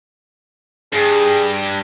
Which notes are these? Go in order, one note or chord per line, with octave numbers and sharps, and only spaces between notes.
G2 G#4